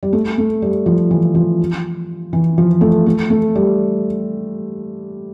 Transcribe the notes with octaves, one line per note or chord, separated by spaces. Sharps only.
G3
A3
A3
G3
F3
E3
F3
E3
F3
A3
A3
A3
G3